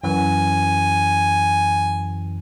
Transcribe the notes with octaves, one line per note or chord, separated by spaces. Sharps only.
F#2 E3 G#5